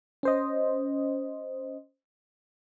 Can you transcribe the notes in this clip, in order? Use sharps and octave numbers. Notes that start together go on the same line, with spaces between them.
C#4 C5 D#5